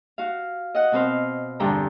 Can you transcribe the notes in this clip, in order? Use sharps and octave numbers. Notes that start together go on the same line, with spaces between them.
F#4 F5
D#5 F#5
B2 C4 B4 C5 F6
E2 G2 D3 G3 G5 A#5